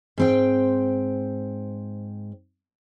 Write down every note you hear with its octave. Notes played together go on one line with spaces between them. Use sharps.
G#2 C4 G5